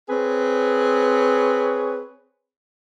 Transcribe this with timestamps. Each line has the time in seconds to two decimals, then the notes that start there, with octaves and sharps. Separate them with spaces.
0.09 C4 G#4 B4 C#5